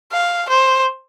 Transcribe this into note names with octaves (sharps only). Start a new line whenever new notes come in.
F5
C5